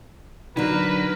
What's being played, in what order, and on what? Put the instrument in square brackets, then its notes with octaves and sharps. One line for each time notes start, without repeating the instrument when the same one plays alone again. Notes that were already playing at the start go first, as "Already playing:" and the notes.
[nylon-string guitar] D3 F#3 [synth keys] D#4 [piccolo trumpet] A#4 [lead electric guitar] B4